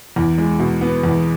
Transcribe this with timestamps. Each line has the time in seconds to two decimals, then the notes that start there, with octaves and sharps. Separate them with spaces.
0.16 E2
0.38 G#3
0.59 B2
0.81 B3
1.03 E2